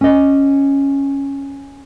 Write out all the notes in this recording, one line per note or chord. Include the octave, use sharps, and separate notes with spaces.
C#4 D#5